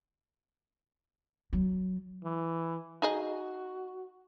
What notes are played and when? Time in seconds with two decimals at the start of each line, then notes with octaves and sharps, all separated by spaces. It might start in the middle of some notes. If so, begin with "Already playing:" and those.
1.53 F#3
2.24 E3
3.02 D#4 F#4 G#4 D#5